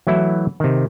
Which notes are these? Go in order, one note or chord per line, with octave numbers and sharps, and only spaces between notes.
E3 F#3 A3 E4
C3 D#3